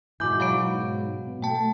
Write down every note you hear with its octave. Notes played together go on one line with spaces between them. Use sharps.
G#2 B2 E3 D6 G6
F#3 F5 B5 D7
B2
A3 G5 A5